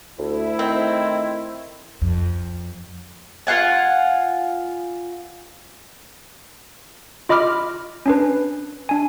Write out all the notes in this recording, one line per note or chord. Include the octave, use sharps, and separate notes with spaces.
D2 A3 E4
D#3 C4
F2
F4 F5 F#5 G#5
F4 D#5 B5 D6 F6
C#4 D4 B4
D4 G#5